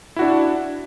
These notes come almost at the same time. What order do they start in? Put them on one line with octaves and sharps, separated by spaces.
E4 F#4 D4